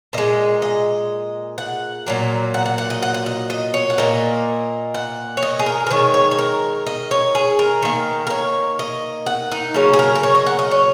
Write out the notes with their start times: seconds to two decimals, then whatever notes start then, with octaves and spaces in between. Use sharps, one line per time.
0.13 A#2 G#3 D#5
0.62 D#5
1.58 F#5
2.06 A#2 F#3 A#3
2.54 F#5
2.66 F#5
2.78 F#5
2.90 D#5
3.03 F#5
3.14 F#5
3.26 D#5
3.50 D#5
3.74 C#5
3.90 F#5
3.98 A#2 A#3 D#5
4.94 F#5
5.37 C#5
5.43 D#5
5.59 G#4
5.66 A#4
5.87 A#4
5.91 D#3 G#3 C#5
6.14 C#5
6.31 C#5
6.39 A#4
6.86 D#5
7.11 C#5
7.35 G#4
7.59 A#4
7.82 D#3 A#3
8.27 A#4
8.30 C#5
8.79 D#5
9.26 F#5
9.52 D#4
9.74 C#3 F#3 A#3 C#4
9.93 G#4
9.99 A#4
10.15 A#4
10.23 C#5
10.35 D#5
10.46 F#5
10.59 D#5
10.71 C#5